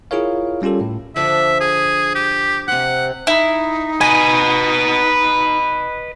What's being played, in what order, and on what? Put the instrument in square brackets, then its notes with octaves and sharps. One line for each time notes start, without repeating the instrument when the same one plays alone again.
[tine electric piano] E4 F4 G#4 A#4 C#5 F5
G3 C#4 F4 G4 A4
A2
[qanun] D3 F3 D4 [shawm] E5
[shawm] G#4
G4
[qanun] C3 C5 [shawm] F#5
[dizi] D#4 [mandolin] E4
[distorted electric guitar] B4 D#5 [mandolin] G#5